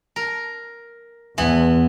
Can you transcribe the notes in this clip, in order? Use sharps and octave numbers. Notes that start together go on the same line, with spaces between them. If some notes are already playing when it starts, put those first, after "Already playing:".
A#4
E2 E3 B3